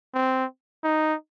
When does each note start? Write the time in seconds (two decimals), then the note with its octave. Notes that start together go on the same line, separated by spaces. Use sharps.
0.14 C4
0.84 D#4